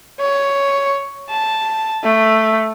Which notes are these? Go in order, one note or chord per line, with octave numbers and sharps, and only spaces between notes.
C#5
A5
A3